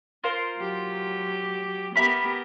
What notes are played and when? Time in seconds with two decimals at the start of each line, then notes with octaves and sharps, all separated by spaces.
0.24 F4 A#4 C5
0.58 F#3 G4
1.96 B3 G4 A#4 E5 A#5 B5